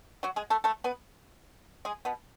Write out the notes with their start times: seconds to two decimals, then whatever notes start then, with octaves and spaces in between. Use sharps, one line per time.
0.23 F#3 F#4
0.36 G#3 G#4
0.50 A3 A4
0.64 A3 A4
0.84 B3 B4
1.85 G#3 G#4
2.05 B2 B3